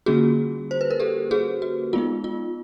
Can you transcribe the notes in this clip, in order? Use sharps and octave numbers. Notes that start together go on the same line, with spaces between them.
D3 G3 A#3 C#4 F4 F#4 G#4
C5
B4
A#4
G4 A4
F#4 G#4
F#4
G#3 B3 D#4 F4
F4